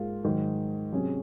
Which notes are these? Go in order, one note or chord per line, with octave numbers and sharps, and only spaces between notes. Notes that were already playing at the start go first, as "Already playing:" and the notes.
Already playing: G#2 A#3 F4 G#4
G#2 D#3 F#3
C3 F#3 C#4 G#4